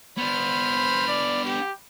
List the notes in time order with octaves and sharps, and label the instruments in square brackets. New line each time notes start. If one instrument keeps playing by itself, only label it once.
[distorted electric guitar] B3 D4 [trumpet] C5 [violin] B5 F6
[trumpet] D5
G4